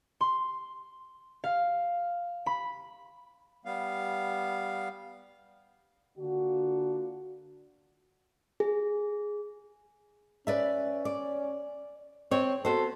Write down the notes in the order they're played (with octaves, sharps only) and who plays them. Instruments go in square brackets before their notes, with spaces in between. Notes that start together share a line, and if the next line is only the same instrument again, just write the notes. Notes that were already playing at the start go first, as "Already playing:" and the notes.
[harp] C6
F5
B5
[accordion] G3 B3 F5
[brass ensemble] D3 A#3 D4 F4 F#4
[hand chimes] G#4
[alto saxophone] C#4 [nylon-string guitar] B4 D5 E5
[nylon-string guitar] D5
[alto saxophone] C4 [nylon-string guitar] C#5
[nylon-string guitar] B3 F#4 C5 [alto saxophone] A4